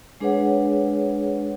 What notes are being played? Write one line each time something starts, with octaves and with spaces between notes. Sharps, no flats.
G#3 D4 G#4 B4 C#5 F#5